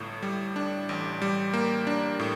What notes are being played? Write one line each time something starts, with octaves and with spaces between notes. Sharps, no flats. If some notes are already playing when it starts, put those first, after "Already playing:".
Already playing: G1 A2
G3
D4
A1
G3
A#3
D4
A2